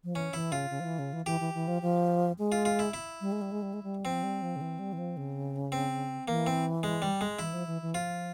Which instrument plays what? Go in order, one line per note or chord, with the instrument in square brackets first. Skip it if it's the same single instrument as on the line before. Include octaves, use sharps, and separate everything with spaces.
[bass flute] F3
[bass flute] E3 [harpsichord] C#4
[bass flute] E3 [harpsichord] E4
[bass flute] C#3 [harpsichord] F4
[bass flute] C#3
F3
E3
C#3
E3
[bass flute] E3 [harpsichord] G4
[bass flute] E3
E3
F3
F3
G#3
[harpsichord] F4
F4
E4
E4
[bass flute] G3
G#3
G3
G#3
G3
G#3
G3
[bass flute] F3 [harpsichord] C4
[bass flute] G3
F3
C#3
E3
G3
E3
F3
C#3
[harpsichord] C4
[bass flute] E3 [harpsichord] A#3
[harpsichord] C4
G#3
G3
G#3
[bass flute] E3 [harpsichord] E4
[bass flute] F3
E3
E3
[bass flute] F3 [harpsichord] F4